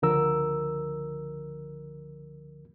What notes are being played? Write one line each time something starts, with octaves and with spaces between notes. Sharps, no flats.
C#2 D3 F3 A#4 E6